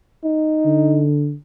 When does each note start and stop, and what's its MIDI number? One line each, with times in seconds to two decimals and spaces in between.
0.24 1.07 63
0.65 1.34 50